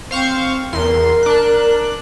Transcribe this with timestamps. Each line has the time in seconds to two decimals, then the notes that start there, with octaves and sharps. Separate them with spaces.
0.11 C4 C5 F5 C#6
0.73 E2 A#4 C6
1.23 D4 F#6